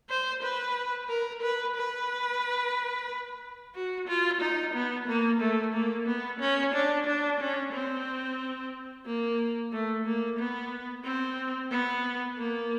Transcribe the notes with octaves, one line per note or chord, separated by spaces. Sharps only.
C5
B4
A#4
B4
B4
F#4
F4
D#4
B3
A#3
A3
A#3
B3
C#4
D4
D4
C#4
C4
A#3
A3
A#3
B3
C4
B3
A#3